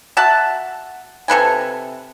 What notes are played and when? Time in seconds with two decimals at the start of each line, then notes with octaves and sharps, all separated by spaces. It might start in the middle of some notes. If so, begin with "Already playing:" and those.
0.17 F#4 E5 F#5 A5
1.28 C3 A4 B4 G#5